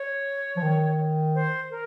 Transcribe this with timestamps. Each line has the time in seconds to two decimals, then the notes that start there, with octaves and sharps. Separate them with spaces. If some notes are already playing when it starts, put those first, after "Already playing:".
Already playing: C#5
0.57 F3
0.62 D#3
1.35 C5
1.71 A#4